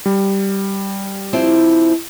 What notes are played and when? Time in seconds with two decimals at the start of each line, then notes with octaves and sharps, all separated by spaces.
0.06 G3
1.33 F3 C4 E4